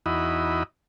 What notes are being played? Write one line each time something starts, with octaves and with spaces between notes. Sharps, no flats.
E2 D#4 E4 F#4 D#5 B5